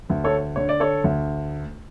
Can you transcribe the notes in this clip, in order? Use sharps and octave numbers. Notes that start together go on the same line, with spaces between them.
D2
A4 C#5
D3 C#5
D5
A4 C#5
D2